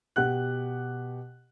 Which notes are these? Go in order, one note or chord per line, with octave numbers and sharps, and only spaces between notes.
B2 G4 F#5 F#6